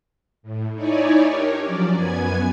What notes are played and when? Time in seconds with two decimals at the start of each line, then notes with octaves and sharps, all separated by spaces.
0.43 A2
0.73 D#4 E4 C#5 D5 G#5
1.27 D4 G4 A#4 C#5
1.61 F3 F#3 C#4 D5
1.94 F#2 B3 G#5 G#6